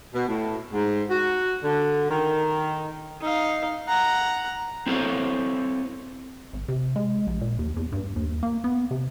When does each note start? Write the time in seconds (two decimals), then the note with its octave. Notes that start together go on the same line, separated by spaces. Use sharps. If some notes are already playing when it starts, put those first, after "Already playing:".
0.13 B2
0.27 A2
0.72 G#2
1.09 F#4
1.63 D3
2.09 D#3
3.21 D#4 F5
3.88 F#5 A#5
4.86 C4 E4 A4 C5 C#5
6.53 G#1
6.68 C3
6.96 G#3
7.27 A#1
7.41 A#2
7.59 D#2
7.77 E2
7.92 G2
8.16 D#2
8.43 A#3
8.64 B3
8.91 C3